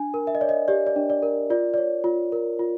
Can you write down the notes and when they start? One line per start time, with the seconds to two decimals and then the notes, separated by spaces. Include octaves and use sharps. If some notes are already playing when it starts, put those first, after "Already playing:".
Already playing: D4 G#5
0.14 A#4
0.27 E5
0.35 D#5
0.41 C#5 D5
0.49 D#5
0.68 G4 D5
0.87 D5
0.96 D4
1.10 D5
1.22 A#4
1.50 F4 D5
1.74 C#5 D5
2.04 F4
2.32 A#4
2.59 F4